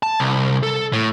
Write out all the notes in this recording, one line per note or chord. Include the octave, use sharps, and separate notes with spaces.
A5
C2
A4
A2